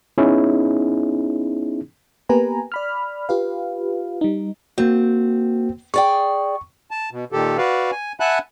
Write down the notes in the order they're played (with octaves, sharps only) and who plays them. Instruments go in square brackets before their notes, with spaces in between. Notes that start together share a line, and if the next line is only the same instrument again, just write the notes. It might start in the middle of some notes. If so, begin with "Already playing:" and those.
[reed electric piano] B3 C#4 D#4 E4 G#4
[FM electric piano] A#3 B3 G4 B4 G#5 A#5
D5 B5 F6
F4 G4 B4 F5
G3 D#4
[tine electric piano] A#3 F#4 [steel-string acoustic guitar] C4
[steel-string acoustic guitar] G#4 D5 G5 [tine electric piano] C#6
[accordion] A5
B2
A#2 D#3 G4 A4
F#4 B4 D5 F5
G#5
E5 F#5 G#5 A5 B5 F#6